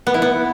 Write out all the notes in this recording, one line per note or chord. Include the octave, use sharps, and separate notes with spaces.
B3
E4
B3